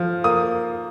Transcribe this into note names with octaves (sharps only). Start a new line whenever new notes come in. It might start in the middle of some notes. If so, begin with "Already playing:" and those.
Already playing: F3 F6
A#3 D#6